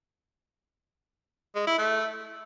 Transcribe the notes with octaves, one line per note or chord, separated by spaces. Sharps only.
G#3
E4
A3